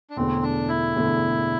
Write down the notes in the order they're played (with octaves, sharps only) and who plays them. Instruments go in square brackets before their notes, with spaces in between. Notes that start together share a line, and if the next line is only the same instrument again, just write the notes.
[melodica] D4
[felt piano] E1 E2 D3 A3 [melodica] C4
[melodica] D4
E4
[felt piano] E1 E2 D3 A3